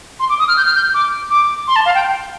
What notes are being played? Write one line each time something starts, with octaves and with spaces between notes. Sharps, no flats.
C6
D6
D#6
F6
G6
F6
G6
D6
D6
C6
A5
F5
G5